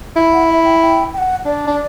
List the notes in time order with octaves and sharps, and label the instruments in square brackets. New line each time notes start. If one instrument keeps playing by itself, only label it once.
[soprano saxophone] E4
[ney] F#5
E5
G5
G5
G5
F#5
[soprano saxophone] D4 [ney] D5
[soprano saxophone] D4